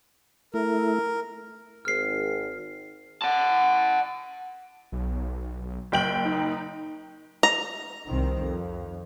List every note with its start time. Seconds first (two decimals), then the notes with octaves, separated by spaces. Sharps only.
0.54 A3 E4 A#4
1.85 G#1 F6 C7
3.22 F#5 A5
4.92 B1
5.92 F#1 G5 F#7
6.25 D#4
7.43 A#5
8.07 C2 D#3 C4
8.41 F2